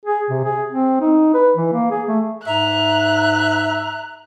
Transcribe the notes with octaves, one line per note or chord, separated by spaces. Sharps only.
G#4
C3
G#4
C4
D#4
B4
E3
A#3
G#4
A3
G#2 E5 A#5 F#6